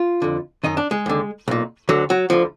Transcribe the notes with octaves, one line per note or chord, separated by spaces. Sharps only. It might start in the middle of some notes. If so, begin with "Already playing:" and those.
Already playing: F4
F2 D3
F#2 D#3 D#4
D4
G#3
D#2 D3
B1 A#2
D2 D3 F#3
F#3
D2 D3 F3